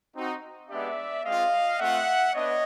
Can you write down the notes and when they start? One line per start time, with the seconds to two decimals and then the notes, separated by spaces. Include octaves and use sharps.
0.14 C4 D#4 F#4
0.69 G#3 B3 D4 G4 D5 E5
1.25 G#3 C4 F4 D#5 F5
1.79 A3 C4 F4 E5 F#5
2.34 B3 D4 C#5 D#5